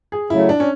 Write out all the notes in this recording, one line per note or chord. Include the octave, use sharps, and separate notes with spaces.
G#4
C#3 F#3 A3 E4
D4
C#4